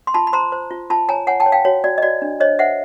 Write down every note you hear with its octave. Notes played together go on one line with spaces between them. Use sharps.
C6
F4 A5 B5
B5
C5 A#5 C6
C5
F4
F4 A5 B5
C#5 G#5 A#5
C#5 F#5 G#5
G5 A5
C#5
F5 G5
F#4 C#5
F#4 D5
D#5
F#4 D5
D4
C5 C#5 D#5
C5 E5 F#5